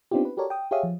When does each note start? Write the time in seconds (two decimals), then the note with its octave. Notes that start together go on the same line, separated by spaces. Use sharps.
0.11 B3 C4 D4 D#4 F4 G4
0.25 B4
0.37 F#4 G4 A4 A#4 C#5 D5
0.50 G5 D#6
0.71 G4 G#4 C#5 E5 F5 D#6
0.83 F3